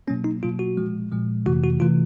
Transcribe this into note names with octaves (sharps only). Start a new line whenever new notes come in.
B2 F#3 A#3 C#4
D#4
B2 F#3 A#3 F4
F#4
A#2 F3 G#3
A#2 F3 G#3
F2 C3 E3 A3 F#4
F#4
C3 E3 A3 F4